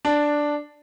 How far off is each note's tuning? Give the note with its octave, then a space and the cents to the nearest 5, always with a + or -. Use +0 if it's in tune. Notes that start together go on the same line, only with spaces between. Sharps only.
D4 +0